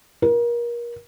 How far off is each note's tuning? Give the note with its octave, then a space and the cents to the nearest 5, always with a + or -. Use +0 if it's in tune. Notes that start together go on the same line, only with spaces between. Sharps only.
A#4 +30